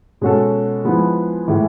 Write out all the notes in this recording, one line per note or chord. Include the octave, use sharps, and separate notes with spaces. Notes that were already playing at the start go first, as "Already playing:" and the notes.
B2 G#3 C#4 F#4 A4
F3 G#3 B3 E4
A2 E3 G#3